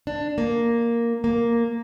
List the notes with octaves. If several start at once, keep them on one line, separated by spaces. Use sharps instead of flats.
D4
A#3
A#3